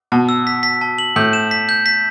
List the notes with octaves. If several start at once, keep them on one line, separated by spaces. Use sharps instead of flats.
B2 A5
E6
B6
B6
A5
F#7
A2 G6
E7
B6
G6
B6